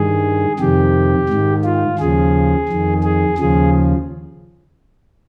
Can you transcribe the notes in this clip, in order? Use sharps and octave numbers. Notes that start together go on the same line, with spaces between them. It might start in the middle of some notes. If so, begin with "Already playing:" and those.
Already playing: G2 D#3 G#4
F2 C3 D#3 G4
G#2 D#3
F4
D#2 C#3 F3 G#4
F2 D#3
G#4
D#2 C#3 F3 G#4